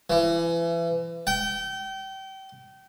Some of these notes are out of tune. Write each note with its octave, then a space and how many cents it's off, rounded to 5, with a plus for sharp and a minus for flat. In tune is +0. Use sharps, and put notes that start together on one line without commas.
E3 +30
G5 -30